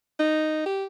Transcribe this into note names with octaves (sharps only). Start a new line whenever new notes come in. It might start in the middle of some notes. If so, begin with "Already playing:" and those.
D#4
G4